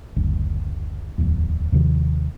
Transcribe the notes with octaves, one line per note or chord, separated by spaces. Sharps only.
F#1 D2
D1 E2
D#2 C3 D#3 F3